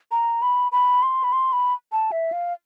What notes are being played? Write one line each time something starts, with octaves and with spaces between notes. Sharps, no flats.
A#5
B5
B5
C6
B5
C6
B5
A5
E5
F5